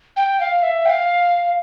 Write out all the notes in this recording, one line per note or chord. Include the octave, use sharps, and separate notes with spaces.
G5
F5
E5
G5
F5